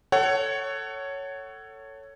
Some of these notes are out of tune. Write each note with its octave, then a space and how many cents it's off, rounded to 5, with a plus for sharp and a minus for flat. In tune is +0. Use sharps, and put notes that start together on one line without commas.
A4 +15 C#5 +0 F#5 +25